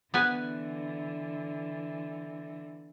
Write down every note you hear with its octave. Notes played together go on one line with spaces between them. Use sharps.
D3 E3 B3 B4 G#5